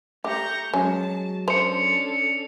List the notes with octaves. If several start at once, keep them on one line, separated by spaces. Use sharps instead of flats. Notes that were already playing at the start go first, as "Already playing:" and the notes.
A3 G4 A#5 C#6 G6
F#3 G#3 C#4 A5
C#4 D4 A4 C5 C#7 F7